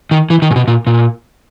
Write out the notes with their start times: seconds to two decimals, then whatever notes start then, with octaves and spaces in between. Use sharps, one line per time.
0.11 D#3
0.30 E3
0.42 D#3
0.51 A#2
0.56 B2
0.68 A#2
0.87 A#2